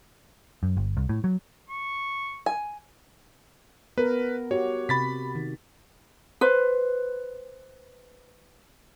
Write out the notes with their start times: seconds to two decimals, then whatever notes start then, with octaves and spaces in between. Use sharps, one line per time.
0.63 F#2
0.77 G1
0.97 C2
1.09 A2
1.24 F#3
1.69 C#6
2.46 G#5
3.98 B3 A#4 B4
4.51 F#4 G4 C#5
4.89 C3 B5 A6 B6
5.35 D#3
6.41 B4 C5